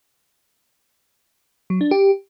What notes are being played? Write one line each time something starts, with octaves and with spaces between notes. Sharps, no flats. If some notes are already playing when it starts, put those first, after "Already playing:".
F#3
D4
G4